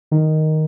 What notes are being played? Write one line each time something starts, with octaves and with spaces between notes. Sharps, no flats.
D#3